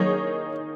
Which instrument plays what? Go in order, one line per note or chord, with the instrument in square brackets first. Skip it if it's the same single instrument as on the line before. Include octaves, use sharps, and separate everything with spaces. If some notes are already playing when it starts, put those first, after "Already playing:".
Already playing: [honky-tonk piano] D#3 A#3 D#4 G#4 C#5 [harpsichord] F#3